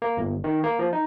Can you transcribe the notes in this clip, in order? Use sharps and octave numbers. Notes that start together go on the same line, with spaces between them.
A#3
G1
D#3
A#3
F3
D#4